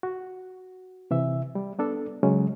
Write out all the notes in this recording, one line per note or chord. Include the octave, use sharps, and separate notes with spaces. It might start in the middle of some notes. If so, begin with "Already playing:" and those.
F#4
C3 E3 E5
G3
B3 D4 A4
C#3 F#3 G#3 C#4